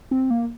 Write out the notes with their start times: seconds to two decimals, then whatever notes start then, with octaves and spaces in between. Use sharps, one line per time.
0.11 C4
0.30 A#3